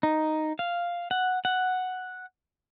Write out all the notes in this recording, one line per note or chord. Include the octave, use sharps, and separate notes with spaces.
D#4
F5
F#5
F#5